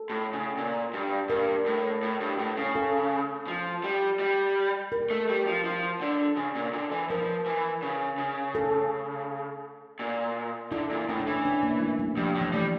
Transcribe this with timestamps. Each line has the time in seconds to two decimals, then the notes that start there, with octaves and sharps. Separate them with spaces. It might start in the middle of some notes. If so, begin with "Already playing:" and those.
Already playing: A4
0.10 A2
0.33 C#3
0.57 A#2
0.93 G2
1.30 G2 A#4
1.66 A2
2.03 A2
2.20 G2
2.39 A2
2.57 C#3
2.75 A4
3.47 F3
3.84 G3
4.20 G3
4.92 A#4
5.10 A3
5.29 G3
5.47 F3
5.64 F3
6.01 D3
6.37 C#3
6.55 A#2
6.73 D3
6.91 E3
7.10 F3 A#4
7.46 E3
7.82 C#3
8.18 C#3
8.55 A4
9.99 A#2
10.72 D3 E4
10.90 A#2
11.09 A2 C#4
11.20 D4
11.27 E3 C#4
11.45 D4
11.63 A#3
11.81 A3
11.99 G3
12.17 G2 F3
12.35 A2
12.41 E3
12.53 G3 A3